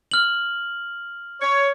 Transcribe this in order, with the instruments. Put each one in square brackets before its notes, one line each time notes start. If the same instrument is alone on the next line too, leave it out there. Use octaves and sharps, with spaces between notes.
[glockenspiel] F6 F#7
[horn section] C#5